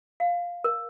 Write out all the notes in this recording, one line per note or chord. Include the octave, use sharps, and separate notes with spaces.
F5
A#4